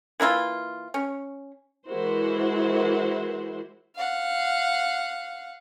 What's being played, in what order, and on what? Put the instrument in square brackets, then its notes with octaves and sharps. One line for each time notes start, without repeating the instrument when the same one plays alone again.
[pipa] E3 A#3 E4 F4
C#4
[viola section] E3 G#3 E4 F#4 A#4 C5
[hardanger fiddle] F5 F#5